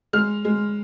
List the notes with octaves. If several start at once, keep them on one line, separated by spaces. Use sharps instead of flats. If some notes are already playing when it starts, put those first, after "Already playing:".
G#3 F6
G#3